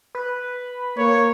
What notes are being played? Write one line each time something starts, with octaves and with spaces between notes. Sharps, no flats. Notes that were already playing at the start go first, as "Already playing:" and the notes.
B4
A#3 C#5